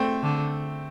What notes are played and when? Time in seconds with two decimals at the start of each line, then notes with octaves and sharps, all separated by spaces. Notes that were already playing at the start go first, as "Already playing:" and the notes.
Already playing: A3 C4
0.22 D3